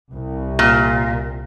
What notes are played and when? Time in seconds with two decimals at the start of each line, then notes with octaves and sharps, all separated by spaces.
0.13 C2
0.59 A#2